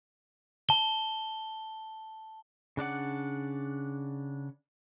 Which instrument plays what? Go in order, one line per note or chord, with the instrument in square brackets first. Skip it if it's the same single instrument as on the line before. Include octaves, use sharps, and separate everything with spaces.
[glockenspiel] A5 G7
[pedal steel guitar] C#3 D4 D5 F#5